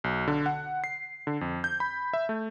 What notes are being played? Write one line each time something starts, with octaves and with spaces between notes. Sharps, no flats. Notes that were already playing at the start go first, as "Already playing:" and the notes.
B1
D3
F#5
C7
D3
F2
G6
B5
E5
A3